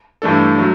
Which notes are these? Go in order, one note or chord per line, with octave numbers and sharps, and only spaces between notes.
G2 E3 A3 D4 A4
F#3 A3